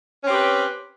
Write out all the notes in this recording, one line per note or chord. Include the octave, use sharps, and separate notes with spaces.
C4 C#4 G4 B4